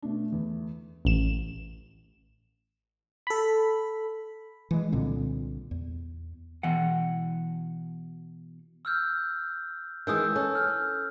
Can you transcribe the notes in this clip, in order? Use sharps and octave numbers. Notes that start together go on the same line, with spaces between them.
B2 A3 D4
E2
A1 E7
A4 B5
E3 G#3
C2 A#2 D3 C4
E2
B2 E3 F#5
E6 F6 G6
D#3 E3 G#3 D#6 E6 G6
C#4 A4
F6 G6